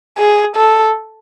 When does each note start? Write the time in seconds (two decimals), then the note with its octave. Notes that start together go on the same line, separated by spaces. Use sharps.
0.18 G#4
0.56 A4